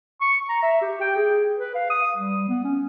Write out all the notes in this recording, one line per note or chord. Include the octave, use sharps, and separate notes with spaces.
C#6
A#5
E5
G4
G5
G#4
B4
F5
D#6
G3
B3
C#4